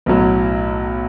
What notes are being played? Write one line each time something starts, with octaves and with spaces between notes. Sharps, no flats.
B1 A2 F#3